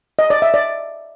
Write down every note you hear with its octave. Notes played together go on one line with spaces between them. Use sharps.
D#5
D5
E5
D5